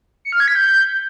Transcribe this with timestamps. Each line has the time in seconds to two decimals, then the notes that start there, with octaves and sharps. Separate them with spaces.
0.25 C#7
0.32 F6
0.40 G#6
0.48 B6
0.55 G6